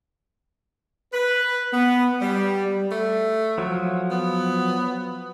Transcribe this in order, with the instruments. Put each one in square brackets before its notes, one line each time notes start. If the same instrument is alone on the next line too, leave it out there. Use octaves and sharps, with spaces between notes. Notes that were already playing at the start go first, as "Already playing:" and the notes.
[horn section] B4
B3
G3
[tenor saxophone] A3
[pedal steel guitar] F3 F#3
[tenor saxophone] B3